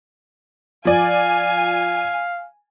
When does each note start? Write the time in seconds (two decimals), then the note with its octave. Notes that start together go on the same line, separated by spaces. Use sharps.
0.85 F3 D5 F5 G#5